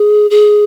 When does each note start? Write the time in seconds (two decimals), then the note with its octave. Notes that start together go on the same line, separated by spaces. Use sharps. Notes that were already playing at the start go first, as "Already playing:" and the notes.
Already playing: G#4
0.30 G#4